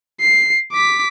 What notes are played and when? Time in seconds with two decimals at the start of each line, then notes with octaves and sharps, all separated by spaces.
0.21 C7
0.72 D6 B6